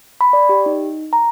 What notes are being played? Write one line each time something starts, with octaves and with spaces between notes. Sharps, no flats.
B5
D5
G4
D#4
A#5